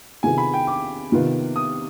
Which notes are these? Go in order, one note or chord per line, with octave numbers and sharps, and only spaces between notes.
C3 D#3 B3 F4 G#4 G#5
B5
G5
D6
C3 D#3 B3 F4
D#6